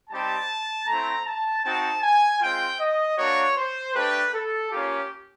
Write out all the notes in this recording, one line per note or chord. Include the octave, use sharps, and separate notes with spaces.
G3 C4 D#4 G4 A5
A3 C4 E4 A#5
A5
C4 D#4 F#4 A5
G#5
G#3 C4 F4 G5
D#5
A#3 D4 F#4 C#5
C5
A3 D4 G4 B4
A4
A#3 C#4 F4 G4